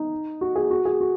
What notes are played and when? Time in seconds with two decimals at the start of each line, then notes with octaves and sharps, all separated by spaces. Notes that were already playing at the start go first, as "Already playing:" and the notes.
Already playing: D#4
0.41 F#4
0.56 G#4
0.71 F#4
0.85 G#4
1.01 F#4